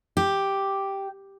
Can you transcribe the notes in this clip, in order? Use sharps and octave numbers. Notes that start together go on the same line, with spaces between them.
G4